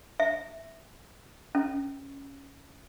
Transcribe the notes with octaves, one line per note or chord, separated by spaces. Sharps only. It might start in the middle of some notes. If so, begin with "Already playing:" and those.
E5
C#4